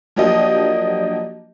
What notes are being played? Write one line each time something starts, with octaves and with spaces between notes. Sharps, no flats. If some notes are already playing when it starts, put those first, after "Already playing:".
F3 F#3 A#3 D4 G4 D#5